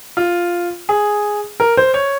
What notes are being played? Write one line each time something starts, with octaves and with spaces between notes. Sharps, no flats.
F4
G#4
A#4
C5
C#5